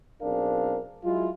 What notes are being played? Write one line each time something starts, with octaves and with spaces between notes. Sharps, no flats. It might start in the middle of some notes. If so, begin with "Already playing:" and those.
B1 C4 D4 G#4 A#4 F5
F#3 G#3 E4 F4